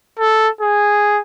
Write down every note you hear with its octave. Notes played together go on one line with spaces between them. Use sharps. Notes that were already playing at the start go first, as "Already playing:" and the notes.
A4
G#4